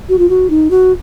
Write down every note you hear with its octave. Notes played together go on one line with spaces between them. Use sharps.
F#4
F4
F#4
D#4
F#4